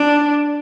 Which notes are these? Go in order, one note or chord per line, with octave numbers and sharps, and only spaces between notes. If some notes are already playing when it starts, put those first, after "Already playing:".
Already playing: D4